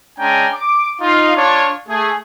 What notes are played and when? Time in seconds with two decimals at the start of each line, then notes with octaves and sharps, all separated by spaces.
0.19 G#3 C#4 D4 G5 G#5 A#5
0.55 D6
1.01 D#4 F4 F5
1.37 D4 F4 C#5
1.89 A3 G#4